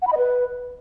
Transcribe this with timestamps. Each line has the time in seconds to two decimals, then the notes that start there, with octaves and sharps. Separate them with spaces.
0.02 F#5
0.07 B5
0.12 D#5
0.18 B4